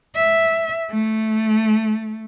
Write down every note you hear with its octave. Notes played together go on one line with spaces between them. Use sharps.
E5
A3